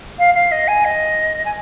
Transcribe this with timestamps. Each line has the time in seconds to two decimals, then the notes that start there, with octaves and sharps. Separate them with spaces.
0.18 F5
0.34 F5
0.51 D#5
0.67 G#5
0.84 D#5
1.45 G#5